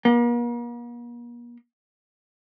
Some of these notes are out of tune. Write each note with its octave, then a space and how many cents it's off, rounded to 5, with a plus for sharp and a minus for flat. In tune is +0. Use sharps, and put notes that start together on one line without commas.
A#3 +45